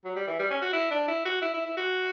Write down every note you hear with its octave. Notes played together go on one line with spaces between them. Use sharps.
F#3
G3
E3
G3
C#4
F#4
E4
D4
E4
F#4
E4
E4
E4
F#4